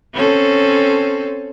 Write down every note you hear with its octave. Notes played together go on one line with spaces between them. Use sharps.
C4 C#4 A4